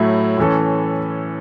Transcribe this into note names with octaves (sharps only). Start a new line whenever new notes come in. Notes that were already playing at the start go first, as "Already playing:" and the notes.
Already playing: A2 F#3 A3 E4
A2 E3 C#4 A4